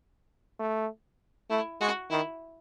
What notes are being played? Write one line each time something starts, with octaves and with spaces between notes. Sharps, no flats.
A3
A3 E4
G#3 F#4
D#3 E4